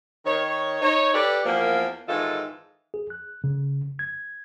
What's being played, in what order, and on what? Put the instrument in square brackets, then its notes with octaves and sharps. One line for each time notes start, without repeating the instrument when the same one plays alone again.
[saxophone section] D#3 C#5
D#4 C#5
G4 A4 B4 D5
E2 F3 A#3
G#2 D#3 E3 F4 A4
[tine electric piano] G#4
F#6
C#3
G#6